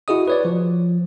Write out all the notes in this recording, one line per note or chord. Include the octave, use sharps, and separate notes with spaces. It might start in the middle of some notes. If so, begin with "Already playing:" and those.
E4 F#4 G#4 D#5 D#6
B4 C#5 D5
F3